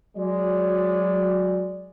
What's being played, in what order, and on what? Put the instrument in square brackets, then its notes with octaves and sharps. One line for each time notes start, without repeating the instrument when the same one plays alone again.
[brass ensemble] F#3 G#3 D5